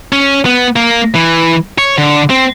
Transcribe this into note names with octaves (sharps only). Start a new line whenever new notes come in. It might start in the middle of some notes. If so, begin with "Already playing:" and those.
C#4
B3
A#3
E3
C#5
D3
C4